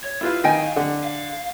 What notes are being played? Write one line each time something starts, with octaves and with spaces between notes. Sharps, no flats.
C#5
D#2 E4 F4 B4 F5
D#3 D#5 G5 G#5
D3
F5